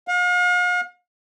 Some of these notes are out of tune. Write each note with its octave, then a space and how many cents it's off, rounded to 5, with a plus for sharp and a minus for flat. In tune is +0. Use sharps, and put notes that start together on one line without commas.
F5 +45